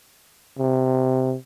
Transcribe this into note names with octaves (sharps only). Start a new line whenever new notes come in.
C3